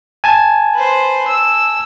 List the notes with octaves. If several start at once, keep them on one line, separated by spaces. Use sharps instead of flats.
G#5 A5 G#6
B4 C5
E6